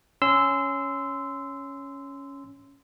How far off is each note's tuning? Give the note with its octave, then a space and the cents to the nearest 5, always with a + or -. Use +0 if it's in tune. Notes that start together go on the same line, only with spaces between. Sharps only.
C#4 +5 C6 -20 E6 +0